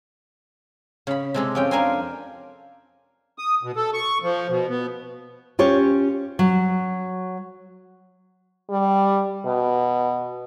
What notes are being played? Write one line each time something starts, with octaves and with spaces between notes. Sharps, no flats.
C#3 B5
C3 G#3 A4
F2 C#4 G5
D4 A#4 F5 G#5 A#5 C6
D#6
B2
A4
C#6
F3
B2
B3
C#4 F4 G4 C#5
F#3
G3
B2